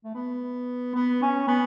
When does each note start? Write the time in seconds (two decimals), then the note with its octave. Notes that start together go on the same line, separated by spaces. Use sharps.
0.05 A3
0.15 B3
0.95 B3
1.22 C#4
1.48 B3